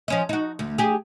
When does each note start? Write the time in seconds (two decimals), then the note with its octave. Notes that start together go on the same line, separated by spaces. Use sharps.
0.08 F3 C#4 D#5
0.29 D#4 F#4
0.59 D2
0.78 G4 G#4